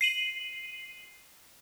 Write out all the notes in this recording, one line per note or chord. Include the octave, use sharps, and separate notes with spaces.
C7 D#7 F#7